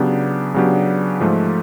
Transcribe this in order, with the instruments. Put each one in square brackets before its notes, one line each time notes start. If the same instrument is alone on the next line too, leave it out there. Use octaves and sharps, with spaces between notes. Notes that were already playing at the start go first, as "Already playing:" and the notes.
Already playing: [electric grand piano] C#3 F#3 B3 D4 G4
C#3 F#3 B3 D4 G4
G#2 F3 A3